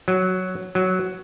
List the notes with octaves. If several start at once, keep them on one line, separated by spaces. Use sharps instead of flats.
F#3
F#3